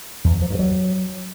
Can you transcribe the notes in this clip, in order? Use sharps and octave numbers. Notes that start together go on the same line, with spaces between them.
E2
F#3
F3
G2
F#3